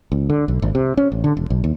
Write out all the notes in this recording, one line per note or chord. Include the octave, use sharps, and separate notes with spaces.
C#2
D3
B1
G#1
C3
C#4
A1
D3
E1
B1
D#2